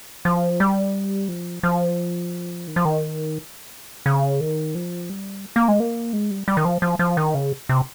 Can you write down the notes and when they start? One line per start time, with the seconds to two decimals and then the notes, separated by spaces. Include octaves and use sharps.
0.25 F3
0.60 G3
1.28 F3
1.63 F3
2.67 D#3
2.76 F3
2.85 D#3
4.06 C#3
4.40 D#3
4.75 F3
5.10 G3
5.56 A#3
5.68 G#3
5.80 A#3
6.13 G#3
6.31 G3
6.48 G3
6.57 D#3
6.65 F3
6.82 F3
6.99 F3
7.17 D#3
7.34 C#3
7.69 C3